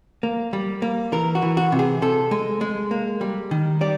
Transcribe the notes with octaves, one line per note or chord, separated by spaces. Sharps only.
A#3
G3
A#3
E3 A#4
F#4
E3
F#4
C3
G#4
C3 A4
G#3
G#3
A#3
G3
D#3
G3 D5